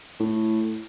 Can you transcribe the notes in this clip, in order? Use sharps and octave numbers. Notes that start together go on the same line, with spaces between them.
A2